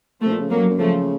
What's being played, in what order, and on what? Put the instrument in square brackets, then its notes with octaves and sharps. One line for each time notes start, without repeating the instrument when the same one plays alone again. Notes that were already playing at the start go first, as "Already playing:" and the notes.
[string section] F3 A3
[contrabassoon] C3
A#2
C#3
[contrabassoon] F2 [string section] F#3 A#3
[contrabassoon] F#2
F#2
[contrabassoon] C#3 [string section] F3 A3